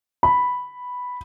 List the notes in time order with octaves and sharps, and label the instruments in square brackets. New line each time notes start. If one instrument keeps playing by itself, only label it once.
[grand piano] B5